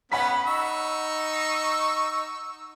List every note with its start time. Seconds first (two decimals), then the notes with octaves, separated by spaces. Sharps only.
0.12 B3 C#4 F#5 B5 B6
0.46 D#4 C#6 E6